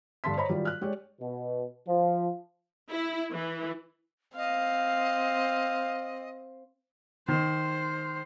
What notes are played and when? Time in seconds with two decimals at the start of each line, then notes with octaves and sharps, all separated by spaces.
0.24 G2 D3 A5 C6 B6
0.37 C5 C#5 D#5 A#5 B5
0.49 D#3 F#3 G3 F4
0.65 F6 F#6
0.81 G#3 G4 C#5 D5
1.20 B2
1.88 F3
2.91 E4
3.32 E3
4.37 C4 D#5 F5
7.28 D#3 C5